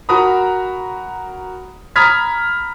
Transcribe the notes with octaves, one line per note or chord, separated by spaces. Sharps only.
F#4 A#4 A#5 B5 D#6
A#5 B5 D#6 F6 G#6 B6